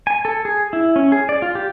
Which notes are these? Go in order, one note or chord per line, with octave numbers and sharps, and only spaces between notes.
G#5
A4
G#4
E4
C#4
G#4
D5
F4
G4